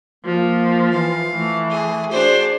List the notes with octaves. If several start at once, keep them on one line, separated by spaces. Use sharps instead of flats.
F3 A#3
E3 F5
E3 A3
G#4
D4 F#4 G#4 C5